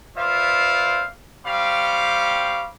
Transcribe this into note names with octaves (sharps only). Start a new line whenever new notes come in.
F4 B4 C5 D5 E5 F5
G3 C4 F5 B5 C#6 D6